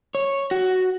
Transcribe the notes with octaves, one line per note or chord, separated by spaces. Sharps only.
C#5
F#4